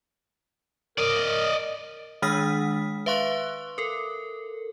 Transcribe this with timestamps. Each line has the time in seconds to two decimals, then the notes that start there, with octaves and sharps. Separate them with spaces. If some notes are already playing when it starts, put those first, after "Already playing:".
0.98 A#4 D5 D#5
2.22 D#3 G#3 D4 D#6 F6 B6
3.06 B4 E5 F5 C6 C#6 F#6
3.78 A4 A#4